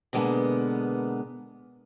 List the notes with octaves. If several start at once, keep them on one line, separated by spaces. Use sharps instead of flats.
B2 D3 G#3 A#3 B3